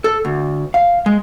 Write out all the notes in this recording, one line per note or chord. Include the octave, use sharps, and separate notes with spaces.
A4
D2
F5
G#3